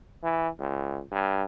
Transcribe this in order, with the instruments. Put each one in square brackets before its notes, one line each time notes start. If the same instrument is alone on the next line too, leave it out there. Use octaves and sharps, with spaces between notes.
[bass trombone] E3
C#2
G2